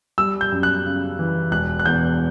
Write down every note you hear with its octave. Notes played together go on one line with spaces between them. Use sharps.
G3 E6
G6
F#2
F#6
C#3
E3
E1 F#6
F#6
E2 G6